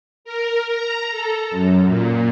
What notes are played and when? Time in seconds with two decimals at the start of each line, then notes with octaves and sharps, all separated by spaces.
0.25 A#4
0.70 A#5
1.10 A4
1.51 F#2
1.85 A#2